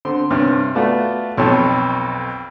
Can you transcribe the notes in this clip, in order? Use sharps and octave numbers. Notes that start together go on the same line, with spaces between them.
D3 C4 C6
G2 C3 C#4 F6
A3 B3 F4 F#4 D5
B1 F2 C#5 A5